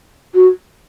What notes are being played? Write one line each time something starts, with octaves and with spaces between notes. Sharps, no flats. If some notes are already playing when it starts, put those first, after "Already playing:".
F#4